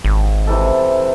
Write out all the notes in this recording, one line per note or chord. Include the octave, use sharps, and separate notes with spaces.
G#1
C3 E3 A4